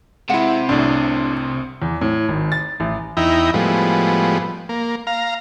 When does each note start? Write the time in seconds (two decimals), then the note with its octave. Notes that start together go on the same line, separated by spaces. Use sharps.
0.30 C3 G#3 E4 F#5
0.69 C2 A2 D4
1.82 E2
2.01 A2
2.29 G#1
2.52 A6
2.80 A1
3.17 E2 D#4 E4 G5 A#5
3.54 A2 F3 G3 G#3 B3
4.69 A#3
5.07 F5 A#5